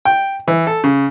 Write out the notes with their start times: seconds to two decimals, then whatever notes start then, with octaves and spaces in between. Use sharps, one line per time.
0.05 G5
0.48 E3
0.67 A4
0.84 C#3